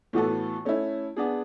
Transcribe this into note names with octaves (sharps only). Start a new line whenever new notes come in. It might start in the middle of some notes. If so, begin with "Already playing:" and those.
A2 E3 B3 F#4 A4
A3 C#4 E4
B3 D4 G#4